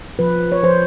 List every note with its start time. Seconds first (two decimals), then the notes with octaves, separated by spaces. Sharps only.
0.19 F3 B4
0.52 C#5
0.63 F3 C5